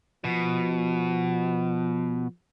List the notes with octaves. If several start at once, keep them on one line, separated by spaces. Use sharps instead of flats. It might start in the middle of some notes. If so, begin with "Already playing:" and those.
B2 F3